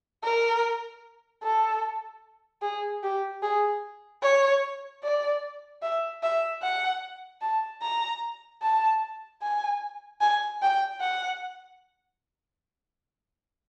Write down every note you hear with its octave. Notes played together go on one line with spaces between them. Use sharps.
A#4
A4
G#4
G4
G#4
C#5
D5
E5
E5
F#5
A5
A#5
A5
G#5
G#5
G5
F#5